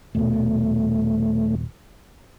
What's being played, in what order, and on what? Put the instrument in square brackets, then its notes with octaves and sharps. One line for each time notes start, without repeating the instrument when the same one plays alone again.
[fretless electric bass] D#1 B2 [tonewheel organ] A3